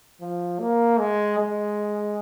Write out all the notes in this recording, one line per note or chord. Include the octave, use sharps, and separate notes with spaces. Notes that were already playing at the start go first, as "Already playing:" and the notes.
F3
A#3
G#3
G#3